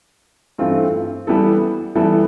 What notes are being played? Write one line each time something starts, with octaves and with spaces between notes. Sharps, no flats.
G2 E3 A3 C4 F4
E3 G3 B3 E4 A4
E3 G3 B3 E4 A4